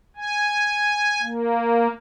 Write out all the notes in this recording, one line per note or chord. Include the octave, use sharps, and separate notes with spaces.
G#5
A#3